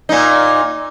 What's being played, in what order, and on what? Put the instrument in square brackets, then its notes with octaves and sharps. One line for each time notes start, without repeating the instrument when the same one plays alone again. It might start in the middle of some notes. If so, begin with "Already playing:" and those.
[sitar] A#2 D#4